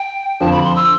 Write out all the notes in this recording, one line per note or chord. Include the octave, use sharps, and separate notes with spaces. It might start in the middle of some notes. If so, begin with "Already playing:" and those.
Already playing: G5
F2 D3 F3 A5
B5
C6
E6